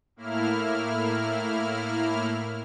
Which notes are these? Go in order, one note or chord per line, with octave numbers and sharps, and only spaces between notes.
A2 A#3 E4 F6